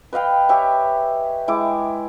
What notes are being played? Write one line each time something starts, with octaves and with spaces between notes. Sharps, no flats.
B4 D#5 F5 G5
G4 C#5 E5 G#5
G#3 E4 G5 D6